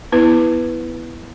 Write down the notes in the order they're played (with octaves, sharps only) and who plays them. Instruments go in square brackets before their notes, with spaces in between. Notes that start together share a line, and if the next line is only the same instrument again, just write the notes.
[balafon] B3 E4 B4